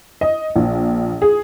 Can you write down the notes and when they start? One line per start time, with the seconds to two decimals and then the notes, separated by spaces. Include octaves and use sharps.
0.21 D#5
0.56 A#1
1.22 G#4